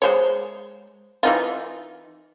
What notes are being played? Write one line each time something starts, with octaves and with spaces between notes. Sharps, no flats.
G#3 C5 C#5
E3 D#4 F4